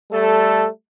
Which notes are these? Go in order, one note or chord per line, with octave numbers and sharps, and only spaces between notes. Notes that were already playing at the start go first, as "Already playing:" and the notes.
G3 A3 A4